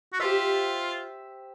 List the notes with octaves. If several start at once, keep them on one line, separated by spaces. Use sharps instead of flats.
F#4
F4 G4 C5 E5